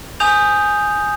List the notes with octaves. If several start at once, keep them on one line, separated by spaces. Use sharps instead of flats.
G#5 D#6 G6 F7